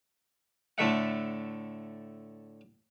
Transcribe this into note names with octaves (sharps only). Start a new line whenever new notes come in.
A2 D3 A3 E5 F#5